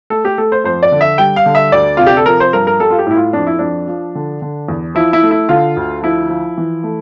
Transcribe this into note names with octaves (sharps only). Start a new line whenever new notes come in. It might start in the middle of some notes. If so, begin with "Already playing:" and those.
A3 A4
G4
A3 A4
C5
F2 C5
D5
D3
E5
G3 G5
F5
D3
E5
D2 D5
C3 F4
G4
A4
F3 A#4
C5
G2 A#4
A#4
G3 A4
F4
G4
A2 E4
F4
F2 D4
E4
F2 D4
F3
D3
D3
E2
F3 E4
E4
A3
E4
D3 F4
D2
F3 E4
F3
E3
A3